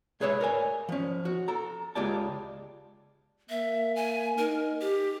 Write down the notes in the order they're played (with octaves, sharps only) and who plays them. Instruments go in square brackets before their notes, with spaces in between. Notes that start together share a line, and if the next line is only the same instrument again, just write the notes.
[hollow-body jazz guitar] G#3 G#4 B4 C#5 D5 E5
A#4 D5 G#5
F3 C#4
F#4
A4 A#5
C#2 G#3 F4 G4 D5 A5
[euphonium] A#3 [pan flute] E5
[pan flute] G#5
[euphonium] D#4 [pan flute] A#4
[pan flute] G4